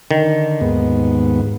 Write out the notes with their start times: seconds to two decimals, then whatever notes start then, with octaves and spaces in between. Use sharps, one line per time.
0.11 D3 D#3
0.61 D#2 G#2 B3